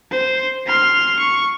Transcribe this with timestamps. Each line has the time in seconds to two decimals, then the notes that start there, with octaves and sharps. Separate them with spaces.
0.11 C5
0.67 C6 F6
1.19 C#6